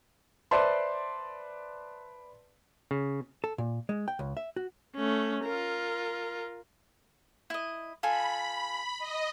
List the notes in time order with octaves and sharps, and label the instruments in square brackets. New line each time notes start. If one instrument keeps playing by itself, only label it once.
[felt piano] B4 C5 D5 E5 A5 C6
[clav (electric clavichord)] C#3
[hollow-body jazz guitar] A4
A#2
G#3
G5
C#2
E5
F#4
[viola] A3 C#4
F4 A#4
[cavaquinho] E4 D#5
[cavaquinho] F4 A4 G#5 [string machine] B5
[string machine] D#5